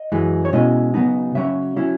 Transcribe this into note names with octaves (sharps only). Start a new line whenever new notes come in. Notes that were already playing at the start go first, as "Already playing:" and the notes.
Already playing: D#5
F#2 E3 G#3
C#5
B2 G#3 C#4 E4 D#5
C#3 F#3 B3 D#4
C#3 F#3 C#4 E5
F#3 C#4 E4